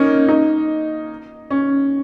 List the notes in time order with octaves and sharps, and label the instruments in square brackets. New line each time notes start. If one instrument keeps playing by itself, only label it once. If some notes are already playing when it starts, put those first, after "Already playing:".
Already playing: [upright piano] A#3 C#4 D#4
D#4
C#4